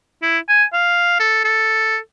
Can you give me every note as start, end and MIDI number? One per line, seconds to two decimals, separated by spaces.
0.22 0.39 64
0.49 0.64 80
0.73 1.16 77
1.20 1.40 69
1.45 1.98 69